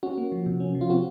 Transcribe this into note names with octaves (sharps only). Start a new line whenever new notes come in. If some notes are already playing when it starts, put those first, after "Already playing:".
C#4 F#4
A#3
F3
C3
C#4
F3
F4
C4 F#4